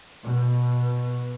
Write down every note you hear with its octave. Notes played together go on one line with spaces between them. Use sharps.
B2